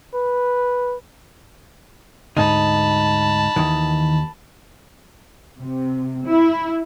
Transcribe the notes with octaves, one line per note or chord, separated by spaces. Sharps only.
B4
D2 G#2 D#4 A5 B5
D#2 D#3 E3
C3
E4